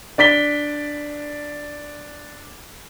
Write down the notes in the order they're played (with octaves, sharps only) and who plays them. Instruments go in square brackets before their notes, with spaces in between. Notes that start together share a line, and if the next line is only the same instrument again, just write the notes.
[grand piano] D4 D5 B6 G7